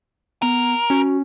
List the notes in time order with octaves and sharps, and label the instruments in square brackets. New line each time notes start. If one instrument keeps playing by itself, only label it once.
[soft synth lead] B3 [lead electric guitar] A#4
[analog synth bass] C#4 [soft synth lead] F#4